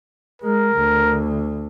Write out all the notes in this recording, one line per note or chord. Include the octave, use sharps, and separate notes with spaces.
G#3 A#4
D2